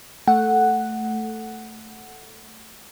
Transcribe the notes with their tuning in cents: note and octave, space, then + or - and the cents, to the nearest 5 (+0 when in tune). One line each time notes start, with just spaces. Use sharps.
A3 +0 F#5 +0